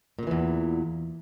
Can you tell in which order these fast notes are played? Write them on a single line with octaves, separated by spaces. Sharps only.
A#2 D3 E3 E2